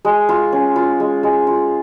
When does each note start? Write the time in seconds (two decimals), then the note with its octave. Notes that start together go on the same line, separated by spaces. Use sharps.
0.05 G#3
0.29 F4
0.52 C#4
0.76 F4
1.00 G#3
1.23 G#3
1.47 F4